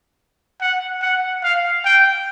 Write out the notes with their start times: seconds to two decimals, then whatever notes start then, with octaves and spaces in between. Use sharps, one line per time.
0.61 F#5
1.02 F#5
1.43 F5
1.85 G5